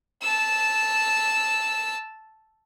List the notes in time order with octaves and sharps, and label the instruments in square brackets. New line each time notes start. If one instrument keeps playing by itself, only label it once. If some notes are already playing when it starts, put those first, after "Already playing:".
[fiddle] A5 E6